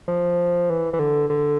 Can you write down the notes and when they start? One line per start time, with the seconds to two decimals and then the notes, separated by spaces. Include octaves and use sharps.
0.08 F3
0.70 E3
0.93 E3
0.99 D3
1.30 D3